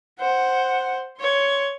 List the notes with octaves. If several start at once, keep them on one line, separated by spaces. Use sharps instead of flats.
C5 F#5
C#5 C6